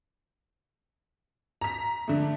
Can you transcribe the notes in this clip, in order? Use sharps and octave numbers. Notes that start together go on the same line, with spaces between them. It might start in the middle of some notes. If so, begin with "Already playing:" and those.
A#5 B6
D3 A3